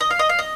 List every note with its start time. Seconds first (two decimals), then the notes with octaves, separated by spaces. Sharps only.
0.01 D#5
0.11 F5
0.19 D#5
0.29 F5
0.39 D#5